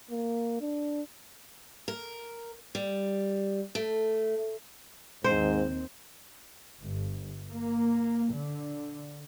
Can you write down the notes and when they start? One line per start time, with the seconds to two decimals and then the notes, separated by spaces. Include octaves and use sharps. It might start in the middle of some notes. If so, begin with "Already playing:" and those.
0.11 A#3
0.61 D4
1.88 A#4
2.75 G3
3.75 A3
5.24 D#2 G#2 D#3 C4 C5
6.82 G1
7.50 A#3
8.32 D3